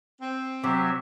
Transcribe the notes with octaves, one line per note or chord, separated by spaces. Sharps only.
C4
C3 F#3 G4 E5